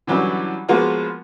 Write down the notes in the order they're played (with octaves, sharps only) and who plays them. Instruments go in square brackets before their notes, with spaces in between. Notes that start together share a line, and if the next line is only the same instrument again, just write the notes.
[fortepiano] D3 E3 F#3 G3 C#4 E4
F3 G#3 A#3 B3 F4 F#4